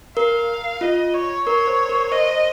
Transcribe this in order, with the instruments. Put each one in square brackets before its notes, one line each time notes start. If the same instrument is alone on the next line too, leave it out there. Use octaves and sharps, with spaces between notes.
[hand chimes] A#4 [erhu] F5
[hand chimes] F4 [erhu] D#5
[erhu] C#5
[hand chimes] A#4 [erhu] C#5
[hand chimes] C5
A#4
[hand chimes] C5 [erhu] D#5